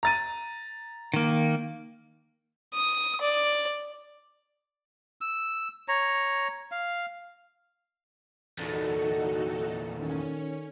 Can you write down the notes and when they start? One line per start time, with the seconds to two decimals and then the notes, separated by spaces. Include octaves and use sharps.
0.03 A#5 A6 D#7
1.14 D#3 A#3
2.74 D#6
3.21 D5
5.21 E6
5.88 C#5 A#5
6.72 F5
8.59 E2 A#2 D3 D#4 F#4 A4
9.98 D#3 C#4